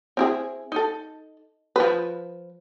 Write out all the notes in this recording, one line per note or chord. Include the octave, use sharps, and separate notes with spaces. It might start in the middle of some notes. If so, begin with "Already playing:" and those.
C4 E4 G#4
D#4 A4
F3 B4